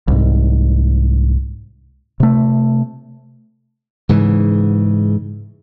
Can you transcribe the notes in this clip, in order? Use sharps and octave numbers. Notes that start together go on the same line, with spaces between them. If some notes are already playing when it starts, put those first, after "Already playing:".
C2 G#2
C3 A3
G#2 C#3 E3